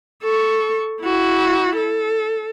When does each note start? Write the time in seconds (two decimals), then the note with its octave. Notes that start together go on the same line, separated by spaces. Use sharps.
0.23 A4 C#6
1.01 E4 F#4
1.76 A4